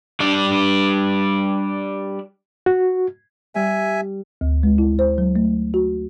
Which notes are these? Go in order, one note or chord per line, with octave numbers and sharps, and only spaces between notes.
G3 D4 D5
F#4
G3 E5 G#5
D2
G#3
E4
C5
F#3
A3
F#4